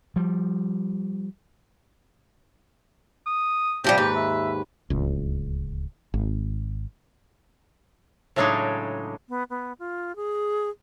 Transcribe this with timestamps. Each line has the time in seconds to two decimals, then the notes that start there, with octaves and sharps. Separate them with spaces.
0.16 F3 G3
3.26 D#6
3.84 C3 F3 G3 G4
3.98 D#2 G#2 B4
4.16 E5
4.90 D1 C#2
6.14 G#1
8.36 A2 C#3 F#3 G#3 D4 D#4
9.29 B3
9.50 B3
9.79 F4
10.16 G#4